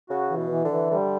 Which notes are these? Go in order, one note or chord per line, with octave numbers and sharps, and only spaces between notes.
C#3 F#4
E3
B2
E3
D3
E3
D3 G3